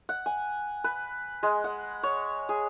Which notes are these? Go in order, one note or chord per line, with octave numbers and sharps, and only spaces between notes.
F#5
G#5
B4
G#3
F#5
C#5
G#4